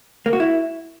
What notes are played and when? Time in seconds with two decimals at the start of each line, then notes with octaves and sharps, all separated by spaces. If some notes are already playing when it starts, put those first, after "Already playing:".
0.26 A#3
0.33 F#4
0.40 E4